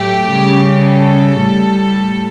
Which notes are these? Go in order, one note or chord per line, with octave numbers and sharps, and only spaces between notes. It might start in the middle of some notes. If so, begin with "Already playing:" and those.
Already playing: A2 F#3 A3 G4
C#3 G3
A4
A2 G3